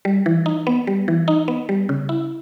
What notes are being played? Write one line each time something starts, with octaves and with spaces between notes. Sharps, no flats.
G3
E3
D#4
B3
G3
E3
D#4
B3
G3
C#3
E4